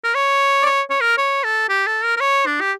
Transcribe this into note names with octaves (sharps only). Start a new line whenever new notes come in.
A#4
C#5
D5
C#5
C#5
A#4
C#5
A4
G4
A4
A#4
A#4
C#5
D4
G4